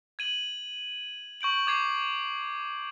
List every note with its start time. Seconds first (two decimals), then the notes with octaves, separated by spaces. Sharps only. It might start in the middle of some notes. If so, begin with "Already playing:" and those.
0.19 G#6 D#7 F#7
1.41 C#6 G6 D7 F#7
1.67 D6 G#6 C7